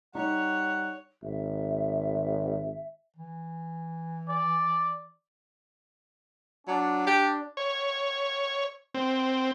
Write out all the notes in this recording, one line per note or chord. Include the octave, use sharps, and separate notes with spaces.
G3 D#4 C#5 F#5
G#1 E5
E3
D5
F#3 D4
G4
C#5
C4